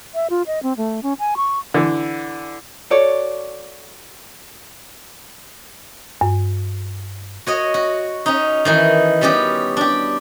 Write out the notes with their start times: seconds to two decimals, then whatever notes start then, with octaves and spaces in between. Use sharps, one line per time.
0.15 E5
0.30 F4
0.47 D#5
0.63 C4
0.77 A3
1.03 C#4
1.19 G#5
1.37 C#6
1.74 D3 E3
2.90 F#4 A4 C#5 D5
6.21 G2
7.47 F#4 C#5 D#5
7.74 F#4
8.26 C#4 D#4
8.65 D#3 E3 D#4
9.21 G3 B3 C#4 F#4 G4
9.77 D4 G4